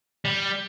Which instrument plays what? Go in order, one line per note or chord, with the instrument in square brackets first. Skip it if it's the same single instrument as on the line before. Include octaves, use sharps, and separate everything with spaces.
[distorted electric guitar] G3